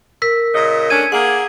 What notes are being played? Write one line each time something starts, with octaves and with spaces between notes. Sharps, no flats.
A#4 E6 B6
A#2 C#3 D#5
A3 C#4 D4 G#6 D#7
A#3 G#4 F#5